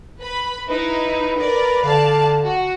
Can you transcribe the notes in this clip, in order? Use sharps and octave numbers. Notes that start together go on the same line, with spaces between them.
B4 B5
D#4 E4 B4
A#4 D5
D3 D5 F5 A5
F#4